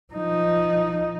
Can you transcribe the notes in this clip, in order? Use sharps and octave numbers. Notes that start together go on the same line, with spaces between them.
F3 D#4